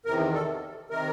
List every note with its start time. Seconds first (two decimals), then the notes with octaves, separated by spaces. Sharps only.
0.05 E2 C3 D#3 A#4
0.33 A4
0.90 C3 D#3 A#4